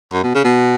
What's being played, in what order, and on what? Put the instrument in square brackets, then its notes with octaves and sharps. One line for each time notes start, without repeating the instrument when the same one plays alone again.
[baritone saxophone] F#2
B2
C#3
B2